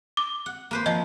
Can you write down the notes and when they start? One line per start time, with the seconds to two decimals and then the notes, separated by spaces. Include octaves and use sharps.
0.17 D6
0.46 F#5
0.71 A#3 B4 C5
0.86 F3 D#5